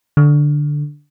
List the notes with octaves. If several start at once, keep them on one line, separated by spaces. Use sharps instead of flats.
D3